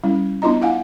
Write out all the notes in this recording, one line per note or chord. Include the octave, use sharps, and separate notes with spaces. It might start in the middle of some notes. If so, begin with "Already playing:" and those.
G3 C#4 E4
B3 D4 E4 F4 D#5 A#5
E4 F5 F#5 G#5